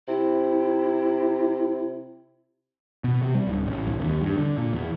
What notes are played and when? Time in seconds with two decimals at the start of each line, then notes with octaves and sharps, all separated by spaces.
0.08 C3 E4
3.04 B2
3.22 C3
3.34 G3
3.47 D1
3.67 A1
3.87 C2
4.00 D#2
4.21 G2
4.38 D3
4.58 A#2
4.73 E2